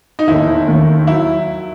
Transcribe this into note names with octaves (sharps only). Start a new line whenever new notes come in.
D#4
E1 D#2 D#3 E4
D#2 D#3 A3
F#3 E4